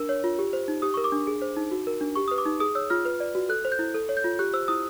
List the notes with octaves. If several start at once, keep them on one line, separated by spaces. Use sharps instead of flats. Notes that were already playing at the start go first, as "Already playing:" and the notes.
Already playing: D4 A#4 E6
C#5
F4
G4
C5
D#4
G4 D#6
A#4 C#6
D6
D4
G#4
C5
D#4
F#4
A#4
D4
G4 C#6
B4 D#6
D6
D#4
G#4 D#6
C#5 E6
F4 F6
B4
D5
F#4
A4 F#6
C5
G6
E4
A4
C#5
G6
F4
G4 F#6
C5 E6
E4 D#6